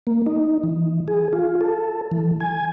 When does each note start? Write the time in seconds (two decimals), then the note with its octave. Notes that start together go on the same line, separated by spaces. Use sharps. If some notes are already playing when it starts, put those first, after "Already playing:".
0.07 A#3
0.26 D#4
0.63 E3
1.08 G#4
1.33 F4
1.61 A4
2.11 E3
2.40 G#5